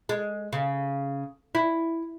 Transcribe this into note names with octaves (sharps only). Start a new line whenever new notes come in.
G#3
C#3
E4